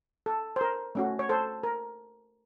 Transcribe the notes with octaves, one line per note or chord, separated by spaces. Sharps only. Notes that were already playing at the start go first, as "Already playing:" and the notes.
A4
C5
A#4
A3 C#4 F#4
C#5
A4 C5
A#4